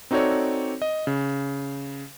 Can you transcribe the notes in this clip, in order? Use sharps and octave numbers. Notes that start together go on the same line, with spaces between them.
C4 D#4 F#4 A4 C#5 D5
D#5
C#3